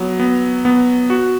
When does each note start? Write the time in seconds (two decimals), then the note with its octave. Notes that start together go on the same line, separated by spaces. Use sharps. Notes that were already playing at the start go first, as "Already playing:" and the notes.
Already playing: F#3 B3
0.20 B3
0.65 B3
1.10 F#4